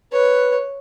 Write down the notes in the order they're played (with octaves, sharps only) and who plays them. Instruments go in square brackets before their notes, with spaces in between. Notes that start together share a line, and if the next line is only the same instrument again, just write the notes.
[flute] B4 [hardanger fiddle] C#5